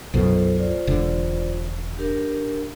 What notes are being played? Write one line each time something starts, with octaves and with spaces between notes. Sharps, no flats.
B1 F#2 B2 F4 A4 C5
F4 C5 D5
E1 D3
D4 G4 A#4